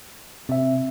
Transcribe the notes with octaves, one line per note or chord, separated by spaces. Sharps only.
C3 C4 E5